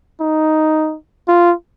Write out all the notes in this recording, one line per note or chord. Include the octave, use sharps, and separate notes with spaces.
D#4
F4